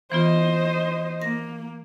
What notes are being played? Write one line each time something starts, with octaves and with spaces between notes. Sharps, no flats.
E3 B3 F4 C5 D#5
A#3 A#6